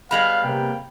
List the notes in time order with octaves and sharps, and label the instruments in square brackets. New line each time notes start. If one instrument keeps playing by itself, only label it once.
[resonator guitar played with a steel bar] G3 G#3 B3 [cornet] F5 [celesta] B5 F7 F#7
[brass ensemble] C3 A#3 [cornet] G5